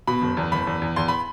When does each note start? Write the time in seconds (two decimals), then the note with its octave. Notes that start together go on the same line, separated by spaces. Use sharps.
0.07 B2 B5
0.22 F#1
0.37 E2
0.52 F#1 B5
0.67 E2
0.82 E2
0.96 E2 C6
1.08 B5